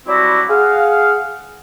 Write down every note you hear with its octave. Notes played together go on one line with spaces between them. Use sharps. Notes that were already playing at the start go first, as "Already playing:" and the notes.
F#3 G3 C4 D4 E4 F#4
G#4 F5 F#5